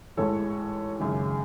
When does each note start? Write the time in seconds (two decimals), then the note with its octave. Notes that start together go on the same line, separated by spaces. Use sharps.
0.17 A1 G#2 E3 A4 C#5
1.00 G#1 F#2 C#3